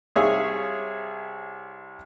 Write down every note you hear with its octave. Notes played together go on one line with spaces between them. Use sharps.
C2 G#4 C#5 E5 F5 E6